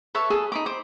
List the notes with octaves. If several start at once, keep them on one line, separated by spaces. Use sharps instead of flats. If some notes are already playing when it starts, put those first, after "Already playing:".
A4 B4 C#5 E5
G#4 A4 B5
D#4 B5 D6
C5 D6